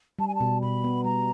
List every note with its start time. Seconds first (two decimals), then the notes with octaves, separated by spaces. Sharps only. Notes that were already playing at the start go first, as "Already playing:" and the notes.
0.19 G3 A5
0.28 G#5
0.35 A5
0.40 B2
0.61 B2 B5
0.84 B3
1.04 G3 A#5